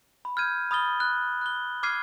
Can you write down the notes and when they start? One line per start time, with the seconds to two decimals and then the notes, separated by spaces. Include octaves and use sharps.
0.25 B5
0.37 F6 G6 G#6 D#7
0.71 B5 D#6 F6 A6 G7
1.00 F#6
1.41 F#6 G7
1.83 D6 F6 G#6 C7 D#7